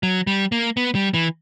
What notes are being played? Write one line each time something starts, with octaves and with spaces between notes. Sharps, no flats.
F#3
G3
A#3
B3
G3
E3